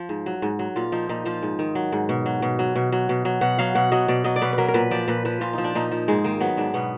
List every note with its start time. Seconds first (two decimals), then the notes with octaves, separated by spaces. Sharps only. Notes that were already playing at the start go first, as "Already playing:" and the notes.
Already playing: F3
0.09 G#2
0.26 F#3
0.42 G#2
0.59 F#3
0.76 A#2 F4
0.92 F3 D#4
1.09 A#2 D#4
1.25 F3 F4
1.42 G#2
1.59 D#3
1.75 F#3
1.92 G#2
2.09 B2
2.26 F#3
2.42 B2
2.59 F#3
2.76 B2
2.92 F#3
3.09 B2
3.25 F#3
3.41 B2 F#5
3.59 F#3 F5
3.75 B2 F#5
3.92 F#3 D#5
4.08 B2 D5
4.24 F#3 D#5
4.36 D5
4.42 B2 B4
4.53 B4
4.58 F#3 A#4
4.68 A#4
4.74 A#2 B4
4.91 F3 D5
5.08 A#2 B4
5.25 F3 B4
5.41 A#2 F4
5.53 F3 D#4
5.64 D4
5.75 A#2 D#4
5.91 F3
6.08 G#2 G#3
6.24 D#3 A#3
6.40 F#3 B3
6.57 G#2 D4
6.74 B2 B3